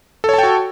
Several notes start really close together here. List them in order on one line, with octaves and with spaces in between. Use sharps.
A4 C#5 A5 G5 F#4